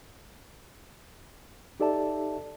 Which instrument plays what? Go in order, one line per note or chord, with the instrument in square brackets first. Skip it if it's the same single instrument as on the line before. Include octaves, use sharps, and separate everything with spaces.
[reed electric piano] D#4 G4 A4 D5 E5 A5